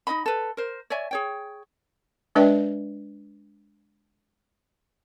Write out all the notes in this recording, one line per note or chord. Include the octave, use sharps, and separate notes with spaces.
D#4 F4 D#5 B5
A4 B4
A#4 C5
C#5 D5 E5 G#5
G#4 C#5 G5
G#3 D4 B4 D5 E5 G5